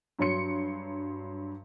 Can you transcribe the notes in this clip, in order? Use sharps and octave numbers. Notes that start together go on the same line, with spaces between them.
G2 F#3 C#5 C6 C#7